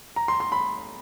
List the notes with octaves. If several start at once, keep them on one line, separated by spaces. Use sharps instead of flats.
A#5
C6
C6
B5